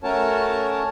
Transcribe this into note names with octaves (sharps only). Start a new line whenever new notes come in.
A3 C#4 F#4 A#4 C#5 A5